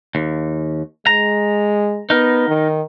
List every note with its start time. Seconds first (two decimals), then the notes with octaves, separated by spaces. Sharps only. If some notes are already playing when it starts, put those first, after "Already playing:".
0.15 D#2
1.07 G#3 A#5
2.10 B3 D#4 A#4
2.48 D#3